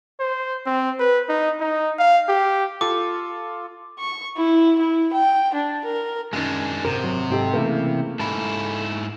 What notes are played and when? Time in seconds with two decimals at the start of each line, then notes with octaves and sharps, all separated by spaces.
0.20 C5
0.66 C4
1.00 B4
1.29 D#4
1.60 D#4
1.99 F5
2.29 G4
2.81 F4 A4 D6
3.99 C#6
4.37 E4
4.79 E4
5.13 G5
5.54 D4
5.85 A#4
6.33 F#2 D#3 G#3 D4
6.85 G#1 C3 A#4
7.04 F#3
7.30 G#2 G4 A4
7.53 C#3 E3 A3 A#3 E4
8.19 G#2 E4 A5 B5